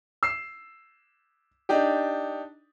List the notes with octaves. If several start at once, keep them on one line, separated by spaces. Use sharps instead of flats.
E6 C7
D4 D#4 G4